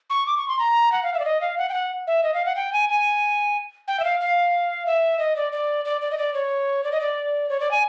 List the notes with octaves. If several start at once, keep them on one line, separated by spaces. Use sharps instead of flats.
C#6
D6
C#6
C6
A#5
F#5
F5
E5
D5
D#5
F5
F#5
G5
F#5
E5
D#5
F5
F#5
G5
G#5
G#5
G5
E5
F5
F5
E5
D#5
D5
D5
D5
D5
D#5
D5
C#5
D5
D#5
D5
C#5
D5
G#5